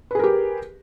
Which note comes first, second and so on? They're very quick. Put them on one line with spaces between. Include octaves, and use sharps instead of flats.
B4 G#4 A#4 G4